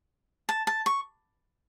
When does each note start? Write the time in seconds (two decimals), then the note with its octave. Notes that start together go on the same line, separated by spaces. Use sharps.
0.49 A5
0.67 A5
0.86 C#6